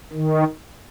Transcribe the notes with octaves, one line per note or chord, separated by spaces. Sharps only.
D#3